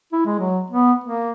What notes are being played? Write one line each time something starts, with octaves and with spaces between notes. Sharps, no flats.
E4
G#3
F#3
B3
A#3